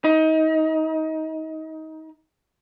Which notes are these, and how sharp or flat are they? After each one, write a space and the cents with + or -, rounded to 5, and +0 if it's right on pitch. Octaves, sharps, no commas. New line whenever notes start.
D#4 +25